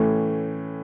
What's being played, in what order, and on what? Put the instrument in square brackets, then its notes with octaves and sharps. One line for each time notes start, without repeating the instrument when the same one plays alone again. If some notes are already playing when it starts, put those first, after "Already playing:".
Already playing: [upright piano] A2 E3 A3 C#4